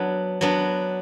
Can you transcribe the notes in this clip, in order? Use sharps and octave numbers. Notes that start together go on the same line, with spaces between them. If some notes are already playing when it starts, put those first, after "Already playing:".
Already playing: F#3 B3 D4
F#3 B3 D4